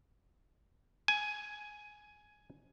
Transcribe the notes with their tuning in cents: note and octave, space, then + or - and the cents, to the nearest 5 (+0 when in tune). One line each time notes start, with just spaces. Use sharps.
G#5 +10